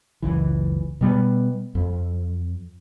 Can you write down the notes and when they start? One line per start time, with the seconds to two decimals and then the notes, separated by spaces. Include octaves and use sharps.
0.22 F#1 C#2 E3
1.01 B2 G3 B3
1.75 F2